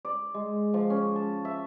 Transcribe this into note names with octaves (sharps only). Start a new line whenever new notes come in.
D5
G#3
F3
C#4
A5
E5